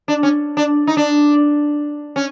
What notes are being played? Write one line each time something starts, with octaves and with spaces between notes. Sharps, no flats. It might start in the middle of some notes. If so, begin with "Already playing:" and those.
D4
C#4
D4
D#4
D4
C#4